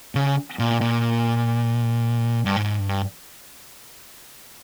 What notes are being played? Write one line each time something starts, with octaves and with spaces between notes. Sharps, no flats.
C#3
A#2
A#2
G2
G#2
G2